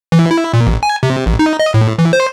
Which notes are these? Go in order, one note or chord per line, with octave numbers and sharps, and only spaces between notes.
E3
E4
A#2
A1
G#5
C3
A1
D#4
D#5
A2
E3
C5